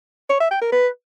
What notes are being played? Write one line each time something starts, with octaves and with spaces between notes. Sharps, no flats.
C#5
E5
G5
A#4
B4